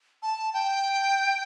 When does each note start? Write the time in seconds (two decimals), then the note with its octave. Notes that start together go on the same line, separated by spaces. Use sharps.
0.22 A5
0.54 G5